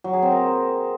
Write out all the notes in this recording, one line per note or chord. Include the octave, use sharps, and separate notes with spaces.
F#3
G#4
C4
A#4